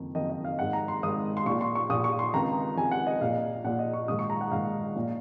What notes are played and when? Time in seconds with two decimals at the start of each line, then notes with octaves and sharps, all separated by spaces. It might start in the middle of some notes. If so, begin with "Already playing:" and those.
Already playing: F#1 F2 D#3
0.15 F#1 F2 D#3 D#5
0.30 D#5
0.45 F5
0.59 G#1 G#2 D#3 F#5
0.73 A#5
0.88 C6
1.02 G#1 G#2 D#3 D#6
1.37 C6
1.46 A#1 A#2 C#6
1.61 C6
1.75 C#6
1.90 A#1 A#2 D#6
2.04 C#6
2.19 C6
2.34 C#2 C3 D#3 A#5
2.77 C#2 C3 D#3 G#5
2.91 F#5
3.07 D#5
3.21 A#1 A#2 F5
3.64 A#1 A#2 F#5
3.79 D#5
3.93 C#6
4.08 A#1 G#2 D#3 D#6
4.19 C#6
4.30 A#5
4.41 F#5
4.51 A#1 G#2 D#3 F5
4.96 A#1 A#2